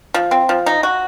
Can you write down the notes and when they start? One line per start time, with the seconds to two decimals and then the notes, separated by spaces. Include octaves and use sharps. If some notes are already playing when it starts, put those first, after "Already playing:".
0.14 F3
0.31 C4
0.49 F3
0.66 D#4
0.83 F#4